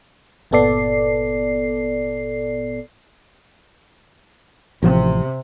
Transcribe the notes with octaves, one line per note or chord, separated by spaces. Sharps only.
G1 A#2 B3 A4 D5 C7
A1 C3 F3